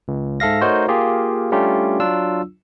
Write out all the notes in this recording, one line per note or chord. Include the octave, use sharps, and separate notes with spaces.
C#2
G#2 A4 E5 F5 A#6
A3 D#4 F#4 A#4 C5 C#5
A#3 F4 G4 G#4
G3 A3 C#4 D4 F4 G4
F#3 D4 F4 E6